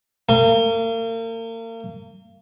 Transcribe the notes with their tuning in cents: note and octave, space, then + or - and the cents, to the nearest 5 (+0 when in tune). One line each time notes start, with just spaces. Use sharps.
A#3 -40